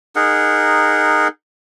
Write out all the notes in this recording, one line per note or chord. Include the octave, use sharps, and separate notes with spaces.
D#4 G#4 A#4 F#5